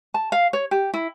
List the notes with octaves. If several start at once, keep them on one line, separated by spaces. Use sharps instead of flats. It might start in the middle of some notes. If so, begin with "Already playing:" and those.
A5
F5
C#5
G4
E4